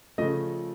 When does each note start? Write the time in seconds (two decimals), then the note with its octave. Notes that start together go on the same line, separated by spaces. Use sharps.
0.18 C#3 F3 A3 D#5